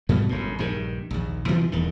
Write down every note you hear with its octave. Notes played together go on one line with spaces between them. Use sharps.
G#2 B2 G3 B3
G1 F#2 A2
A#1 G2 D#3
A#1 D#2
G2 B2 E3 F3
D#1 E2 D#3